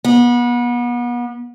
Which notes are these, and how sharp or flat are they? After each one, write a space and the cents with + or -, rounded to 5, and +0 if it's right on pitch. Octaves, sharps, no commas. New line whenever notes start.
B3 -35